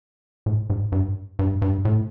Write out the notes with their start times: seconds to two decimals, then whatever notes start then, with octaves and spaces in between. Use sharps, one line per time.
0.46 A2
0.70 G#2
0.92 G2
1.39 G2
1.62 G2
1.85 A2